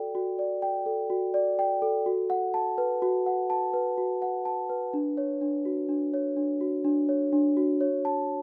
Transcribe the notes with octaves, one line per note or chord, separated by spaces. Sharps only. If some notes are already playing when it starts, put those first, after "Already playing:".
Already playing: F#4 A4 D5 G5
F#4
D5
G5
A4
F#4
D5
G5
A4
F#4
F#5
A5
B4
F#4
F#5
A5
B4
F#4
F#5
A5
B4
D4
C#5
D4
F#4
D4
C#5
D4
F#4
D4
C#5
D4
F#4
C#5
A5